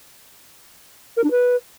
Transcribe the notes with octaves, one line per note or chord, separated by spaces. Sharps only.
A#4
D4
B4